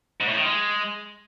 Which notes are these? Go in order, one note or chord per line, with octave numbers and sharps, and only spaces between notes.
G#2
A2
D#3
G#3